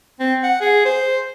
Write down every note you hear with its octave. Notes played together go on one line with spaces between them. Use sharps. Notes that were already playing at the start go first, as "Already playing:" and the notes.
C4
F#5
G#4
C5